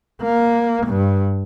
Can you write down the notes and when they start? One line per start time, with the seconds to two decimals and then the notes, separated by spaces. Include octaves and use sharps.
0.22 A#3
0.86 G2